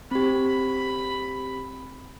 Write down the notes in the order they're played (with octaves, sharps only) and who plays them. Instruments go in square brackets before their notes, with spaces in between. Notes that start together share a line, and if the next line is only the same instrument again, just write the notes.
[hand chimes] C4 G4 [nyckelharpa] B5